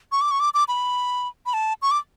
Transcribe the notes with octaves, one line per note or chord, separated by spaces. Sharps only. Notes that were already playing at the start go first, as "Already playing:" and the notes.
C#6
D6
C#6
D6
D6
B5
B5
A5
C#6
D6